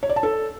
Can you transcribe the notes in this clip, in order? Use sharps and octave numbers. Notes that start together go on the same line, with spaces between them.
C#5
D5
A5
A4